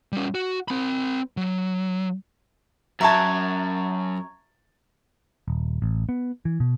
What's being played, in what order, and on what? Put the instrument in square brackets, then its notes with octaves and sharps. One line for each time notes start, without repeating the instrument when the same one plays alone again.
[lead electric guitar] G3 C#4
F#4
C4 B5
F#3
[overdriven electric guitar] F#2 [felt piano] E5 A5 [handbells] A#5 C#6 G#6
[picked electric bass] D#1
A1
B3
E3
B2